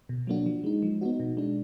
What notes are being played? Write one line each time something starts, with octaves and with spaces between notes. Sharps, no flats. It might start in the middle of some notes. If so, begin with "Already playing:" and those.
B2
F#3 A#3 D4 F#4
F3
G#3 D#4
F3
B3 D#4 F#4
B2
G#3 D4